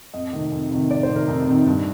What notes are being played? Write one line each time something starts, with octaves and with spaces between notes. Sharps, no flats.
F2 D#5
C3 D#3
F2
C3 D#3
F2 D5
C5
C3 D#3
A#4
F2 D#4
C3 D#3
G2